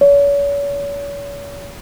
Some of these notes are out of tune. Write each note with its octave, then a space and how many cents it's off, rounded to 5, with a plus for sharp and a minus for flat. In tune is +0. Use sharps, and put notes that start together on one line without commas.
C#5 +40